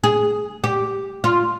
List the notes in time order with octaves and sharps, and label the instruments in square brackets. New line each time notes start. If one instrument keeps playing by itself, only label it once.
[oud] G#4
G4
F4